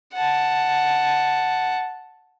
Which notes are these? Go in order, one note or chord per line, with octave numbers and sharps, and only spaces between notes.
F#5 A5